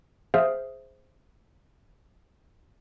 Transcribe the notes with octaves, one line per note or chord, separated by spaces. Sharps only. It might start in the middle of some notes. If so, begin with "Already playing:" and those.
G#4 C5 E5 F5 D#6 F6